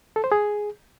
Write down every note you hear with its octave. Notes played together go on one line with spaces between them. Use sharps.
A4
C5
G#4